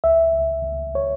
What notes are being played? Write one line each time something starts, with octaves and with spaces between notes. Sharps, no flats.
C#2 E5
C#2
C#2
C#5